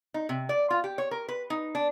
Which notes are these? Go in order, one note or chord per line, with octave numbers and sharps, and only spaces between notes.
D#4
C3
D5
F4
G4
C#5
A#4
B4
D#4
D4